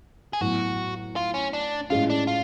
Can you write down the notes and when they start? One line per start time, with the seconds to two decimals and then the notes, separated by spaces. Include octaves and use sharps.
0.33 G#4
0.41 A2 F#3 B3 F#4
1.16 F4
1.34 C#4
1.53 D4
1.90 A2 G#3 C#4 F4
2.10 D4
2.27 F4